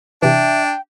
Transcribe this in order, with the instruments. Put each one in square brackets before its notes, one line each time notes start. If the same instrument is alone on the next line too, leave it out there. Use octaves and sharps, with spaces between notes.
[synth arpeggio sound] C3 E3 [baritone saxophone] D4 [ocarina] E5 [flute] G5